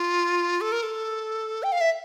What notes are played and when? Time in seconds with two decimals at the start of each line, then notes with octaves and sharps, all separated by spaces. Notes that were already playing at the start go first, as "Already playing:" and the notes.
Already playing: F4
0.61 A4
0.72 A#4
0.83 A4
1.63 G5
1.72 F5
1.81 E5